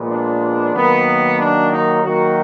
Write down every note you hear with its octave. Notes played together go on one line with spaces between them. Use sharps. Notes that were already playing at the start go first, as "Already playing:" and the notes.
Already playing: A#2 F3 G#3 B3
D4
D#3 F#3 A#3 B3
D4
D#4
D#3 F#3 A#3 F#4